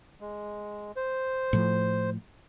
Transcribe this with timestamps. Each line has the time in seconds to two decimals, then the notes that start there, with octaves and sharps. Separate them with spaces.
0.21 G#3
0.96 C5
1.53 A2 F3